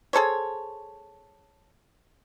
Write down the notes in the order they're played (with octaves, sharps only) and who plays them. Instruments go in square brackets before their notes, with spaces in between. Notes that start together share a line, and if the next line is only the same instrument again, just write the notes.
[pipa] G#4 A4 C5 C#5